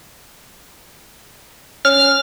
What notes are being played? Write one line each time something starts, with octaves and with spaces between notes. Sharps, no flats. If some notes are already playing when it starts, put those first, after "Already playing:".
C#4 F6